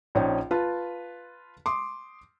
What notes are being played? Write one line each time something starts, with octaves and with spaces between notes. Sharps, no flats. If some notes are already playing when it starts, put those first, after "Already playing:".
A#1 C#4 D#4 G5
F4 B4 A5
C6 D6 D#6